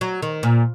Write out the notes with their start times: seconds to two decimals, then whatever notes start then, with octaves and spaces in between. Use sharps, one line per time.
0.01 F#3
0.22 D#3
0.43 A#2